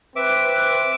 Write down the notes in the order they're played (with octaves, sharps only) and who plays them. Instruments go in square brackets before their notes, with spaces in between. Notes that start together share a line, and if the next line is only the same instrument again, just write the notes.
[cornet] C4 [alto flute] B4 [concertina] E5 D6